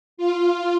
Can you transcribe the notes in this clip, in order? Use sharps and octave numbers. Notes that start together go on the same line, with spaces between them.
F4